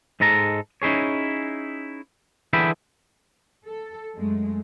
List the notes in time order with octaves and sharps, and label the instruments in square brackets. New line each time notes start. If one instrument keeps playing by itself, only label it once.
[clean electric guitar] G#2 G#3 A4 A#5
C#4 D#4 E4 G#4 C#5
D3 E3 G#4 E5 G5 B5
[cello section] A4
F#2 G#3 A3